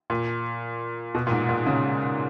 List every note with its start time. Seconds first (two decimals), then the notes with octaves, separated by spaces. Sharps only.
0.10 A#2
1.15 B2
1.27 A#2
1.31 G#2
1.49 A#2
1.66 C#3